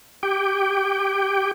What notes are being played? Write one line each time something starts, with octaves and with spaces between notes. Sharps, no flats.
G4 G5